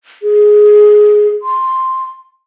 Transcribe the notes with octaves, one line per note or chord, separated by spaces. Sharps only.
G#4
C6